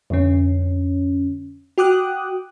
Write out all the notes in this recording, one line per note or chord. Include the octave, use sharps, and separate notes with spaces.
F2 D3 C#4
F#4 G5 D6 D#6 F#6